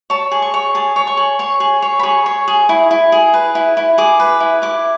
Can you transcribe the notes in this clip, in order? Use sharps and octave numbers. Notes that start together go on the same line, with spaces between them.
C#5 A5
G#4
C#6
C#5
G#4 A5
C#5
C#6
G#4
C#5 C#6
G#4
C#5
B5
G#4 C#6
C#5
G#4
E4
E4
G#4
B4
E4
E4
G#4 D6
B4
E4
E4 D6